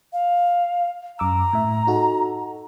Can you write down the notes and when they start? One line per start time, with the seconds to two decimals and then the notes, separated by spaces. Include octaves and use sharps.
0.13 F5
1.19 F#2 A#5 D6 E6
1.53 A2 E5
1.87 D#4 F#4 A4